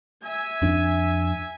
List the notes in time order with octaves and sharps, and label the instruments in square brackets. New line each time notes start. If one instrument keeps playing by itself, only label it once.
[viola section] E5 G#5
[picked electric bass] F2 D4